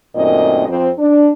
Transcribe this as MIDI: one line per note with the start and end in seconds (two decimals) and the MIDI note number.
0.16 0.65 42
0.16 0.65 46
0.16 0.65 51
0.16 0.65 57
0.16 0.65 60
0.16 0.65 75
0.68 0.90 41
0.68 0.90 60
0.98 1.30 62